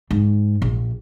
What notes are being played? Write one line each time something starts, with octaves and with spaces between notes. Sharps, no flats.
G#2
A#1